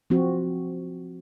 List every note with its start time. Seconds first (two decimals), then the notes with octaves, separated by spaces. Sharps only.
0.10 F3 C4 F#4